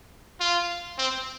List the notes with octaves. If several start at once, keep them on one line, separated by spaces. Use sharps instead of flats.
F4
C4